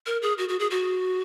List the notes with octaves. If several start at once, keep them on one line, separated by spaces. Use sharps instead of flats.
A#4
G#4
F#4
F#4
G#4
F#4